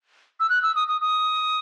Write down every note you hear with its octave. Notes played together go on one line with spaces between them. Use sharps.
E6
F#6
E6
D#6
D#6
D#6